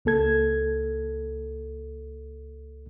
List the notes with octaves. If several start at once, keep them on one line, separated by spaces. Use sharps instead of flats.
C#2 A#3 A4 G#6